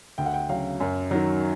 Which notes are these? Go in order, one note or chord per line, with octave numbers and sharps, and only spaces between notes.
D2 G5
F#5
G5
C#3 F#3 F5
F#2
D#3 F#3